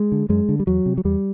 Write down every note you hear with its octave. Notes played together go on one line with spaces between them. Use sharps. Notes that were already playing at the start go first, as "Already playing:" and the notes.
Already playing: G#3
D3
F#2 G#3
D3
G3
E2 F#3
C3
F#3
E2 G3